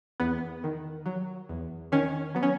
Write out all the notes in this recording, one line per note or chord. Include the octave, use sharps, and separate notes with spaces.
E2 B3
D#3
F#3
E2
D#3 C#4
F#3 B3
C#4